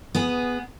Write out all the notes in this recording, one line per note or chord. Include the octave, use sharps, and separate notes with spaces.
B3 G#4